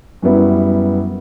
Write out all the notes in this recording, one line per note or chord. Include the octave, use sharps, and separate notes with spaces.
F#2 F#3 G3 B3 E4